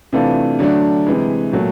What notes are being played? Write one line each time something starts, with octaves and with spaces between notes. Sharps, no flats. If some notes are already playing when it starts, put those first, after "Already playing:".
C3 E3 A3 D4 F4
D3 F#3 A3 D4
C3 E3 G#3
A#2 F#3 A3